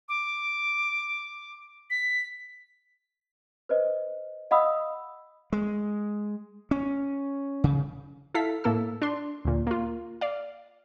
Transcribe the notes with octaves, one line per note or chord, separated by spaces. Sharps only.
D6
B6
B4 C5 D#5
D#5 F5 F#5 B5 D#6 E6
G#3
C#4
C#3
E4 A4 F5 B6
A2 A#3 A4 E6
D4 C6
D2 A#2
A#3 F4
D5 F5